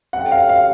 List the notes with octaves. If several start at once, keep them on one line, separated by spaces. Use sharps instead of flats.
C3 F3 A3 C#4 F#5
F5
F5